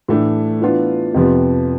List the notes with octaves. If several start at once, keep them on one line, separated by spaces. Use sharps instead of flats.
A2 E3 A3 D4
E3 B3 D4 F4
F2 C3 F3 B3